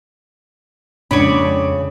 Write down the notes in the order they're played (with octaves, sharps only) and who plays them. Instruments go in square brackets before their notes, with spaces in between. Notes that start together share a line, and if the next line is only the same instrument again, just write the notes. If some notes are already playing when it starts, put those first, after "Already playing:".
[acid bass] F2 [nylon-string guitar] C#3 [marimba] G#3 D4 [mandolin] C#5 D5 B5